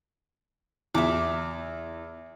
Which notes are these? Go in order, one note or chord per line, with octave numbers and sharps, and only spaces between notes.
E2 E5 D6